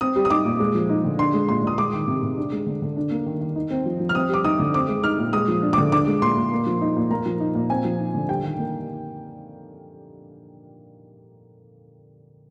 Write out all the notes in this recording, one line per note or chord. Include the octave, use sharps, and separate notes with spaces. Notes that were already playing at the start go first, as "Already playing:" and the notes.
C4 D#6
G3
D#6
D#4 D6
A#2
G#3
F3
D#4
D3
D4 C6
G#3
A#2 C6
A#2 D#6
G#3 D6
D#3
C3
C3
D4
G#3
D3
D3
D4
A#3
D#3
D#3
D#4
C4
F3
F3
F6
C4 D#6
G3 D6
D#4 D#6
D3
C4 D6
G#3
D#4 F6
A#2
G#3 D#6
F3
D4
D3 D6
D4 D6
G#3
A#2 C6
A#2
A#3
F3
D#4
A#2
A#3 A#5
F3
D#4
A#2
C4 G#5
F3
D#4
D3
G3 G5
D#3
A#3